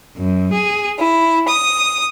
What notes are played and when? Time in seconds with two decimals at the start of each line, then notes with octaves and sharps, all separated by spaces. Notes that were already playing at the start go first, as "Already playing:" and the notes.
0.17 F#2
0.53 G#4
0.99 E4
1.47 D#6